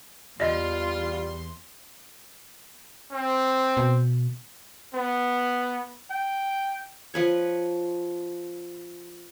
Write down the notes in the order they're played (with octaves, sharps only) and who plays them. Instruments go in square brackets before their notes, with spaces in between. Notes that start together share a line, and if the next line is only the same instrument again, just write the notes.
[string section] E2 C6 [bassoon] G3 [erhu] F4 [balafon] D5 D#5
[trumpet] C4
[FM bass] B2
[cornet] B3
G5
[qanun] F3 B4 C#5